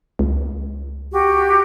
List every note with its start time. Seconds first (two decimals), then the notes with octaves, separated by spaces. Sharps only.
0.19 C#2
1.12 F#4 G4